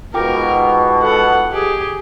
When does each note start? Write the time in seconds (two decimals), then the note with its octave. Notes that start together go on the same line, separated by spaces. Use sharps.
0.14 G#2 B2 F4 A#4 G5 D6
1.00 A4 F#5
1.52 G4 G#4